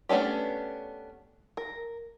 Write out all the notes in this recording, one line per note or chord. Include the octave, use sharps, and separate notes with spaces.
A3 B3 C#4 D4 G4
A#4